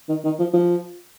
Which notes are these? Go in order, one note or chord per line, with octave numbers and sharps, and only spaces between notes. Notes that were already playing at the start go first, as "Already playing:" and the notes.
D#3
D#3
F3
F3